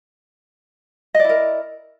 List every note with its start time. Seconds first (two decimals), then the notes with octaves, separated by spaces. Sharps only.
1.14 D#5
1.19 D5
1.24 E4
1.29 A#4